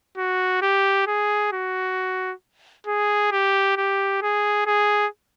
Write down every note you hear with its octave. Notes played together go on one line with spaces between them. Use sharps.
F#4
G4
G#4
F#4
G#4
G4
G4
G#4
G#4